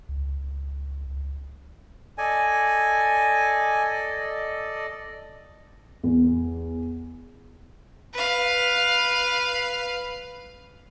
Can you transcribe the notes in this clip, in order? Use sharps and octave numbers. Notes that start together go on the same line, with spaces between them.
C#2
A4 D5 D#5 G#5
E2
B4 F5